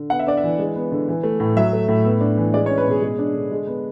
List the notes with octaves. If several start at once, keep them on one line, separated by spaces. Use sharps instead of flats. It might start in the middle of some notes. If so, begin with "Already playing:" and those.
Already playing: D3
B3 F#5
E5
D4 D5
E5
E3
G#3
B3
D3
E3
A3
A2
F#3 E5
A3
A2
B3
D4
E3
G#3 D5
C#5
C#4
B4
B2 G#4
G#3
D4
D3
G#3
B3